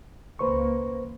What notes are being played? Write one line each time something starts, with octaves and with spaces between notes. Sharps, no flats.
C#2 A#3 B4 C5 C#6